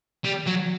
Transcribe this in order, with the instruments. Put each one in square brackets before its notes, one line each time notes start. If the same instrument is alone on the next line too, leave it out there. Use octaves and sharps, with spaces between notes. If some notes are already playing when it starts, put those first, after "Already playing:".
[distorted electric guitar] G3
F#3